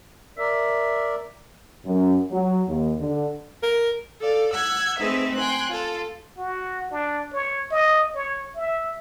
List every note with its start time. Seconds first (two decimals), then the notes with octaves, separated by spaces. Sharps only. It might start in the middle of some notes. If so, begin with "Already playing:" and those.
0.38 A#4 D5 E5
1.85 F#2
2.32 F#3
2.68 D#2
2.99 D3
3.63 A#4
4.20 A4 D5 F5
4.51 F#5 E6 F#6 G#6
4.99 A3 C4 D#4 G#4 B4 E5
5.34 G5 G#5 C6 F#6
5.69 F4 A4
6.38 F#4
6.91 D4
7.33 C#5
7.71 D#5
8.15 C#5
8.55 E5